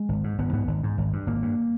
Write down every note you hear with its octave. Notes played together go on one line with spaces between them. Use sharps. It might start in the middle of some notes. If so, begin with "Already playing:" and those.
Already playing: G#3
G#1
G#2
G#1 B3
G#2 B3
G#1
G#2
G#1
G2
G#1 A#3
G2